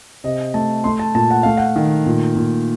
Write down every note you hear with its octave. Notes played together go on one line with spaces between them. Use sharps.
C3 D#5
A3 A5
A3 C6
A5
A#2 A5
F#5
A3 F5
F#5
D#3
A#2
A#2